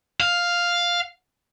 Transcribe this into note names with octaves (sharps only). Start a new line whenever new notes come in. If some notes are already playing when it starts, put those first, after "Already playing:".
F5